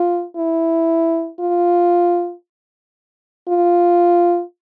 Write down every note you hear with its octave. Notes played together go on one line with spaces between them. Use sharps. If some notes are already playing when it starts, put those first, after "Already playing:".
Already playing: F4
E4
F4
F4